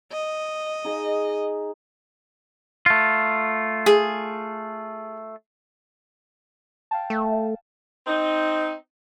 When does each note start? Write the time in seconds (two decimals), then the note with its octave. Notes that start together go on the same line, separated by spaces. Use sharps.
0.12 D#5
0.85 D#4 G#4
2.86 A3 F4
3.86 G#4
6.91 F5 G5 A5
7.10 A3
8.06 C4 D#4